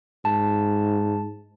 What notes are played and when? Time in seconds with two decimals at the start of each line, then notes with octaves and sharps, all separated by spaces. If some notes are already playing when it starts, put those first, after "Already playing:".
0.25 G#2 A5